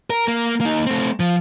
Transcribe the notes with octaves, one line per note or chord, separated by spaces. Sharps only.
A#4
A#3
A#3 D#4
A3 C4
F3